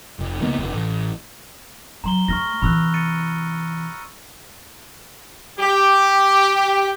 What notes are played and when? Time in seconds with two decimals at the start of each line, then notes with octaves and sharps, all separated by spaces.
0.19 F1
0.40 C#2 D#3 A#3 B3
0.57 F1
0.73 A1
2.04 F#3 A#5 C6 G7
2.28 A3 C#6 F6 A#6
2.62 C3 E3 B5 E6 F#6
2.94 A6 C#7 D#7
5.59 G4